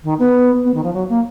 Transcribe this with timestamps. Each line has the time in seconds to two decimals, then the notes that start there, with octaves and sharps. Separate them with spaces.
0.03 D#3
0.19 B3
0.64 B3
0.74 D#3
0.83 F3
0.93 F#3
1.09 A#3